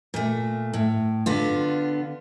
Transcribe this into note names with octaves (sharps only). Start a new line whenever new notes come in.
A#2 A3
A2
D3 B3 F4